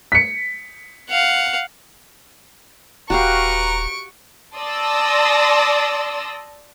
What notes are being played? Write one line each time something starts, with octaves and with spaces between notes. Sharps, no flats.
B6 C#7
F5 F#5
D#1 F#4 G4 B4 F5 A#5 C#6 D7
D5 A5 C6 D#6 E6 A#6